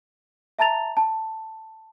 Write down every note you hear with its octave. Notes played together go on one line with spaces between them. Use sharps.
E5 A5 A#5 A6 F7
A5